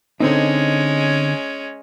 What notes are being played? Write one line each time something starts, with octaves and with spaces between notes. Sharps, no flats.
D3 G#3 C4 C#4 D#4